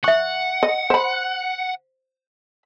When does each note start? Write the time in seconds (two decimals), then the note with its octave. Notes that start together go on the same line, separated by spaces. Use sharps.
0.04 E5 F#5 C#6
0.63 D#5
0.90 C5 B5